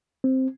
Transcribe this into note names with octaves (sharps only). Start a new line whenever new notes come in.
C4